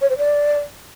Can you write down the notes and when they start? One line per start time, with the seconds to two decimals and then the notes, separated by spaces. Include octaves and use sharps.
0.01 C#5
0.09 C5
0.18 D5